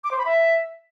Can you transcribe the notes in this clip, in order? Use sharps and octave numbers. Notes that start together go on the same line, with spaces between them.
D6
C5
B5
E5